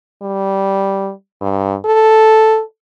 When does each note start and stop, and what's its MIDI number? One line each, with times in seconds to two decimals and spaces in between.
0.22 1.11 55
1.41 1.76 43
1.85 2.62 69